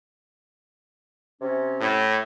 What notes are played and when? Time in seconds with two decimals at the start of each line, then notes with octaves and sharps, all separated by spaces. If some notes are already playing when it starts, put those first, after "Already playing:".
1.41 C3 C#4
1.81 A2